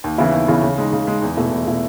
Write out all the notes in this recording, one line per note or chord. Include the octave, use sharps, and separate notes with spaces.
D#2
C#3 E3 B3 E4
D#2
C#3 E3 B3 E4
C#3
G#3 D#4
C#3
G#3 D#4
E2
B2 A3 E4
E2
B2 A3 E4